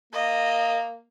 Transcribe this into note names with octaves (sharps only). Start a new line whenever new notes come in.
A#3 D#5